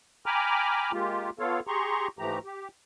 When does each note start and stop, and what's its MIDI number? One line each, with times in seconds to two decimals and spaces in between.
0.26 0.92 79
0.26 0.92 80
0.26 0.92 82
0.26 0.92 83
0.26 0.92 86
0.26 0.92 89
0.93 1.30 56
0.93 1.30 58
0.93 1.30 65
0.93 1.30 67
1.39 1.60 59
1.39 1.60 65
1.39 1.60 69
1.39 1.60 73
1.39 1.60 77
1.67 2.08 67
1.67 2.08 68
1.67 2.08 82
1.67 2.08 84
1.67 2.08 85
2.19 2.39 44
2.19 2.39 52
2.19 2.39 53
2.19 2.39 57
2.19 2.39 67
2.19 2.39 82
2.45 2.68 67